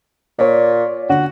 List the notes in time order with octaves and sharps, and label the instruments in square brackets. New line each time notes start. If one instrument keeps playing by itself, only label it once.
[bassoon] A#2 [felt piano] C#5 D5
[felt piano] D3 [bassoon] F#4